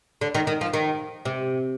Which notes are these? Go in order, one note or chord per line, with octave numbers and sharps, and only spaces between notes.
D3
D#3
D#3
F3
D#3
C3